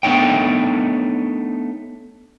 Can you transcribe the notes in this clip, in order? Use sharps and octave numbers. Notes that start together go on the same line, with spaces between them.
A3 B3 D4 D#4 C#5 G5